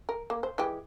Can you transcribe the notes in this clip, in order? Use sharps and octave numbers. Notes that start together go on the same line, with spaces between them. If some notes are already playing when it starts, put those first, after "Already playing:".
A#4
A#3
C5
E3 G#3 G4